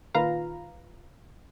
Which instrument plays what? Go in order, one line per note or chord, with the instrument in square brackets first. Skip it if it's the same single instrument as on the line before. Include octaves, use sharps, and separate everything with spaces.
[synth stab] A#2 D#3 F4 B4 F5 A#5